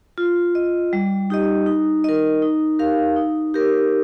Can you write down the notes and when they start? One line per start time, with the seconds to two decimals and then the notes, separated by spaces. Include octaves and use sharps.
0.18 F4
0.55 D#5
0.93 G3
1.30 D#4 G4 D#5
1.66 D#4
2.04 A#4 D#5
2.42 D#4
2.79 G4 A#4 F5
3.16 D#4
3.54 G4 A#4